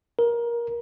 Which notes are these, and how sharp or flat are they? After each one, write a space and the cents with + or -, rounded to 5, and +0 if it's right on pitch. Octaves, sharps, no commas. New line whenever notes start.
A#4 +20